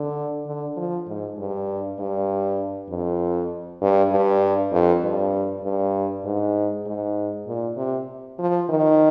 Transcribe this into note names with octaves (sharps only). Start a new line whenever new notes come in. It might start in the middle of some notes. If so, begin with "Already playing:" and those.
Already playing: D3
D3
F3
G#2
G2
G2
F2
G2
G2
F2
G2
G2
G#2
G#2
A#2
C3
F3
D#3